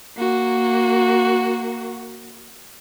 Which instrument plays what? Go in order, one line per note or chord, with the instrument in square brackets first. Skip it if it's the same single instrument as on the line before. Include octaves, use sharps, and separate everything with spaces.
[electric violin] A#3 F#4